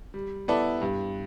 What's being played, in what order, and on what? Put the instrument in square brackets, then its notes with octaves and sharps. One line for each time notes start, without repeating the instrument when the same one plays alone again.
[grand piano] G3
B3 E4 A4 D5
G2